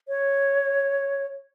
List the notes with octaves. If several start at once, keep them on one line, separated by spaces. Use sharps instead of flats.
C#5